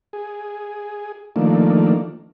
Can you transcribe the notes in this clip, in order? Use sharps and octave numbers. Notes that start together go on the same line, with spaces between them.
G#4
D#3 F3 A3 A#3 D4